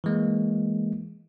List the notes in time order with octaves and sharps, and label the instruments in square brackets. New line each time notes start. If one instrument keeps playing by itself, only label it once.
[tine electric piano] E3 G#3 A#3